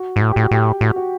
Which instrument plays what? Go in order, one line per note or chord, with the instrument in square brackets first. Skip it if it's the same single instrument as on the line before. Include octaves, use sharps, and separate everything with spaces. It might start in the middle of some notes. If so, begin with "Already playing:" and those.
Already playing: [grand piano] F#4
[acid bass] G#2
A2
[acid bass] A2 [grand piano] G4
[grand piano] F#4
[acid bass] A2 [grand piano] G4
[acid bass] A2 [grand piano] F#4
[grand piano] F#4